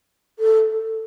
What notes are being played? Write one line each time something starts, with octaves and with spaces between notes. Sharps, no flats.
A4